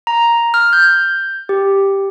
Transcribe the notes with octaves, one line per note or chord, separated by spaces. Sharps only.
A#5
F6
G6
G4